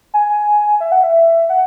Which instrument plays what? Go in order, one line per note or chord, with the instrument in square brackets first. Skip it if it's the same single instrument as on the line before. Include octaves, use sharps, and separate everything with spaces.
[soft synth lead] G#5
E5
F#5
E5
F#5